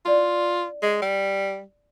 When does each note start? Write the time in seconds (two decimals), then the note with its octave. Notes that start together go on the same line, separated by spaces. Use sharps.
0.05 C#4 E4 F4 D5
0.82 G#3
1.02 G3